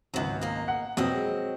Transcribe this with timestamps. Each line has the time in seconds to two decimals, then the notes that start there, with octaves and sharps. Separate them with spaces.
0.14 G#1 C#2 F#3 B3
0.41 A#3 D#5
0.68 F#5
0.97 F2 B2 F#3 C4 D#5
1.13 G#3